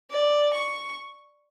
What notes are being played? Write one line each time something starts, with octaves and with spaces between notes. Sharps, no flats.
D5
C#6